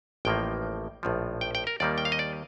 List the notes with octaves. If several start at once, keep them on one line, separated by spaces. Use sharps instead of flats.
A1 A2 F3 A#3 G5
A#1 A2 F3
G5
G5
A#4
D#2 D#3 G3 A#3 D5
G5
F5
D#5
D5